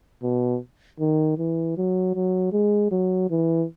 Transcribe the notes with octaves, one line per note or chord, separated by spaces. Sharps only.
B2
D#3
E3
F#3
F#3
G#3
F#3
E3